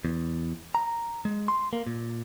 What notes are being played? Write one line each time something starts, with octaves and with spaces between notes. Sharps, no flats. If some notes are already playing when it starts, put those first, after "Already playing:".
E2
A#5
G#3
C6
A#3
A#2